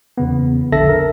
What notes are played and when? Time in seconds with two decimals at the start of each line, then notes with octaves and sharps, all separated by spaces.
0.18 E2 C#3 B3
0.72 A#1 D3 A4 E5 A#6
0.89 A#4